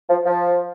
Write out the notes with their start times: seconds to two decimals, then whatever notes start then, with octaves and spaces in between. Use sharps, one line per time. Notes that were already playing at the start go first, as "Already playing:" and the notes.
0.09 F3
0.25 F3